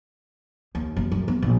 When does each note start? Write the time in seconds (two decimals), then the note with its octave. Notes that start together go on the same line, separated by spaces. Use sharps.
0.75 D#2
0.97 F#1
1.12 F#2
1.28 B3
1.42 A#1